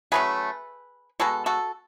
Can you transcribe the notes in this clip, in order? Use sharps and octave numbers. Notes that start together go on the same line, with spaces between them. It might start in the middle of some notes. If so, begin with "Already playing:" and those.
F#3 A3 C#4 G#4 B4
B2 G#3 B3 F#4 A4
F#4 A4